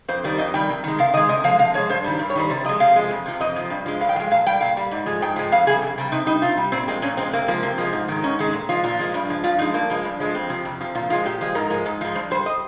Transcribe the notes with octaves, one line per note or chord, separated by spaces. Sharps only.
F2 C5
D#3 G3
F2 D#5
D#3 G3 G5
C3
D#3 G#3
C3 F5
D#3 G#3 D#5
C3 D#5
F3 G#3 F5
C3 F5
F3 G#3 C#5
G2 C5
D#3 G3
G2
C#5
D#3 G3 C5
C3 C5
F3 G#3 D#5
C3 F5
F3 G#3
F2
C3 F3
F2 D#5
C3 F3
G2
F3 G#3
G2 F5
G5
F3 G#3 F5
A#2 F5
G3 G5
A#2 F5
G3
G#2
F3 G#3
G#2 G5
F3 G#3
F2 F5
C3 G3 G#4
F2
C3 G3
C3 D#4
G3 D#4
C3 F4
G3
A#2 C4
F3 G#3 C4
A#2 C#4
F3 G#3 C4
C3 A#3
F3 G#3 A#3
C3
F3 G#3
G#2
D#3 G#3
G#2 C#4
D#3 G#3
A#2
F3 G#3 F4
A#2 F4
F3 G#3
G2
F3 G#3
G2 F4
F3 G#3 D#4
G2 A#3
F3 G#3
G2
F3 G#3
F2 C4
C3 F3
F2
C3 F3
A#2 F4
F3 G#3 F4
A#2 G4
F3 G#3
G#2 A#4
F3 G#3
G#2
F3 G#3
G2 C5
G3 C5
D#5